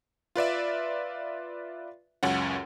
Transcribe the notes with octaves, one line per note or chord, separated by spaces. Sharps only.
F4 B4 D5 E5
C#2 F#2 C#4 F#5